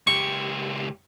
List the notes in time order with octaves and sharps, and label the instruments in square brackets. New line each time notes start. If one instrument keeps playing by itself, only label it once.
[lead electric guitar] C#2 G4 [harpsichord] C#6